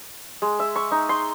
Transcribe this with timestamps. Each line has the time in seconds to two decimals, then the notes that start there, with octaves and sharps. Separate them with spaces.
0.42 G#3
0.60 E5
0.76 C#6
0.91 D#4
1.09 C6